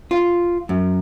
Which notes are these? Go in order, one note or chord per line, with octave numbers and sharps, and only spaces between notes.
F4
F#2